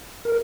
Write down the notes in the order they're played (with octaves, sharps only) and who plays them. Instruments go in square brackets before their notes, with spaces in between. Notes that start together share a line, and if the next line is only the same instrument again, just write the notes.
[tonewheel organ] A#4